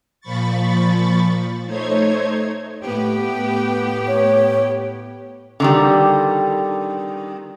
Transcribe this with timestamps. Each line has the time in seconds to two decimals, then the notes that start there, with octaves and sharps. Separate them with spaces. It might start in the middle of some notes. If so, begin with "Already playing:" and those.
0.21 A#2 F3 B5 C#6 A6
1.66 A3 D#4 C5 C#5 G#6
2.84 A2 B3 G4
4.08 C#5
5.60 D3 D#3 G3